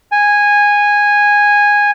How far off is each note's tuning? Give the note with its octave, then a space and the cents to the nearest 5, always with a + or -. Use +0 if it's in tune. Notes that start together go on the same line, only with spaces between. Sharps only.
G#5 -10